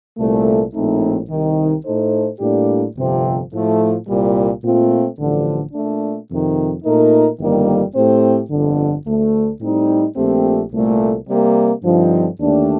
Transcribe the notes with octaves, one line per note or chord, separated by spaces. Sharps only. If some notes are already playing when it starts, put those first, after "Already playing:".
C2 A#2 A3
A#1 A2 A3 C4 D#4
C2 C3 D#3
A2 A3 D#4 A4 C5
A2 G3 A#3 D4 G4
G1 F2 C3 F3 C4
A2 F3 A3
C2 A#2 G3
A#2 A3 C4 F4
A1 G2 D3 F3
A#2 A3 D4
F2 C3 D#3
A#2 A3 D#4 A#4
G1 F2 D#3 G3 A#3
A2 A3 C4 G4 C5
G1 F2 D3
D2 D3 A3
A2 G3 C4 D#4
A#1 A#2 A3 C4 G4
C2 A#2 A3
C3 G3 A#3
G2 D3 F3 C4 D#4
D#2 D3 A3 D4 G4